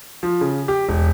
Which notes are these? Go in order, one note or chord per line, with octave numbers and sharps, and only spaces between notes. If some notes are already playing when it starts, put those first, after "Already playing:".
F3
C#3
G4
E1